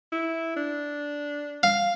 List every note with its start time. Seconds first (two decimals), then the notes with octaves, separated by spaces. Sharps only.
0.12 E4
0.57 D4
1.63 F5